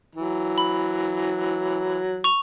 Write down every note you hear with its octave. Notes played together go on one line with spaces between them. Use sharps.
E3 F#3
B5
C#6 F7